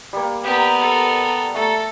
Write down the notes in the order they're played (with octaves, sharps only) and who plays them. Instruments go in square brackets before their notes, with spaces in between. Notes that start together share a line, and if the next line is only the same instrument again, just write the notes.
[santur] G3 A#3
[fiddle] B3 A#4 [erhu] G4
[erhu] A4
[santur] A3 A#5 [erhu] A4